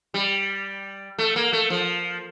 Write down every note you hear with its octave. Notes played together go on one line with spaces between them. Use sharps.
G3
A3
A#3
A3
F3